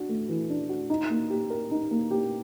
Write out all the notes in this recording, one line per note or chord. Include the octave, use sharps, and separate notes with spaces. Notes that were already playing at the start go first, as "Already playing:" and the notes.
Already playing: D4 F#4
A3
E3
D4
F#4
D#4
A#3
G4
A#4
D#4
A#3
G4